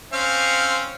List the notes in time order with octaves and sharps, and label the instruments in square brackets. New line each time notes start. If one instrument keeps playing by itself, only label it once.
[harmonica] C4 C#4 F5